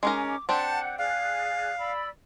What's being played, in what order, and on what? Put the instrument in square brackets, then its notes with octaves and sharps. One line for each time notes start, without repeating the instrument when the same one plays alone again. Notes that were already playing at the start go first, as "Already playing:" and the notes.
[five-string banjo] G#3 D#4 A#4 [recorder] C#4 [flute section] D6
[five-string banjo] C4 D4 G4 [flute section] F#5 G6 [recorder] A5
[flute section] G#4 D5 F#6 [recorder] F5
[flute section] D5 B5 E6